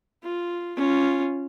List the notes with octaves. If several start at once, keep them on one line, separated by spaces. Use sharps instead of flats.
F4
C#4 F4